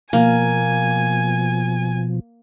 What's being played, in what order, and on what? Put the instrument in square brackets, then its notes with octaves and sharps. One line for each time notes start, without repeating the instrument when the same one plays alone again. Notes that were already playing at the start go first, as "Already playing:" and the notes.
[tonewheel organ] B2 F3 [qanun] A#3 [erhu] G#5